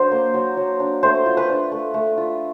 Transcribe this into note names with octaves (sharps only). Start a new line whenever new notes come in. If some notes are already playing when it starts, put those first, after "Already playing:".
Already playing: F#3 D4 C5
A#3
F#3
F#3
D4
A3 C5
F4
B4
D4
A3
A3
F4